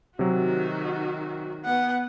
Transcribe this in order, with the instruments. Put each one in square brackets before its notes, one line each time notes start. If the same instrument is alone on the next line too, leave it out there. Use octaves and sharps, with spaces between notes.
[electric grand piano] C3 F#3 [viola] D#3 F#4
[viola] B3 [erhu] F#5